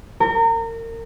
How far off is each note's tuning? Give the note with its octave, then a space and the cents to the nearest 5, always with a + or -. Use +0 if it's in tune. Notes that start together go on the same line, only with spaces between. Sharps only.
A#4 -30